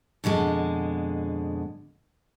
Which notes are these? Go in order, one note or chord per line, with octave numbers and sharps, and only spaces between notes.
F2 B2 D3 G#3